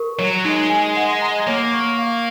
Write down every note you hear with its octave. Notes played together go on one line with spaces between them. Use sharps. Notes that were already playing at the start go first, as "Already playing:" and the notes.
Already playing: A#4 C#6
F#3 C#5
G#3 D#4
G#5
F#5
A#5
A#3 C#5
C#6
F5